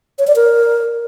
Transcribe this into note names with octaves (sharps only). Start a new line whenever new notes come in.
C#5
D5
A#4